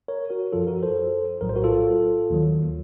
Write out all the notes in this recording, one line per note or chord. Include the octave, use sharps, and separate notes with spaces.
A#4 C#5
F#4 A#4
F#2 F3 F4 A4
F#4 A#4
A4 C5
A#1 A2 F#3 A#4
C5
F#4 A#4
F4 A4
D#2 D#3 F#3